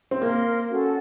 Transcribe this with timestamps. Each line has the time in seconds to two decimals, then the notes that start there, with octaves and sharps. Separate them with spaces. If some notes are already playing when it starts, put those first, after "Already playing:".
0.11 C4
0.22 A#3 A#4 F5 C6
0.68 C#4 F#4 A4